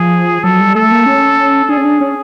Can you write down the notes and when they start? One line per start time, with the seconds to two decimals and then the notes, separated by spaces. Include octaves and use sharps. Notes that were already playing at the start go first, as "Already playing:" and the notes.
Already playing: F3 G#4
0.44 F#3 A4
0.60 G3
0.75 A3 A4
0.91 A#3
1.06 C#4
1.69 D4 G#4
1.77 C#4
1.84 D4
2.01 C#4